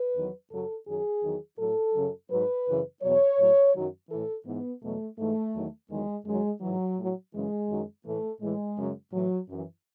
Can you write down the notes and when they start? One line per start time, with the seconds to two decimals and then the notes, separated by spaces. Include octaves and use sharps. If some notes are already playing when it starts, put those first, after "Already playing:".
Already playing: B4
0.15 E2 D#3 F#3
0.51 F#2 C#3 F#3 A4
0.87 F#2 D#3 F#3 G#4
1.22 E2 D#3 F#3
1.59 A2 F#3 A4
1.95 F#2 C#3 F#3
2.30 G#2 F#3 B4
2.67 F#2 C#3 E3
3.02 E2 B2 F#3 C#5
3.39 A2 F#3
3.75 F#2 D#3 F#3
4.10 A2 E3 A4
4.46 G#2 E3 B3
4.82 E2 B2 F#3 A3
5.18 G#2 E3 A3
5.54 E2 D#3 F#3
5.90 E2 D#3 F#3 G#3
6.25 F#2 D#3 F#3 G#3
6.61 G#2 E3 F#3
6.97 A2 F#3
7.34 F#2 C#3 E3 G#3
7.70 F#2 D#3 F#3
8.05 A2 E3 A3
8.41 A2 E3 G#3
8.78 F#2 C#3 F#3
9.13 A2 E3 F#3
9.49 F#2 E3